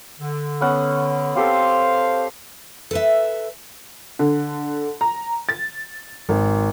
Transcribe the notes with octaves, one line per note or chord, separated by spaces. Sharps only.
D3
B3 C#4 F#5
C4 G4 A4 C5 F5
A4 B4 E5
D3
A#5
A6
G#1